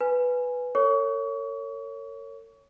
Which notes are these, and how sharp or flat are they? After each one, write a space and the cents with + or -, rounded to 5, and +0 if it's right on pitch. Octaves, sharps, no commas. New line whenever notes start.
B4 +0 G#5 +0
A#4 -45 C#5 +0 C#6 +35